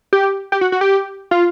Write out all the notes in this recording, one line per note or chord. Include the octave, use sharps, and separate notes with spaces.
G4
G4
F#4
F#4
G4
F4